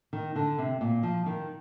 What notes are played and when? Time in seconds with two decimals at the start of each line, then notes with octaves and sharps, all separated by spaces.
0.13 D#3
0.36 D3
0.58 C3
0.81 A#2
1.03 F3
1.26 D#3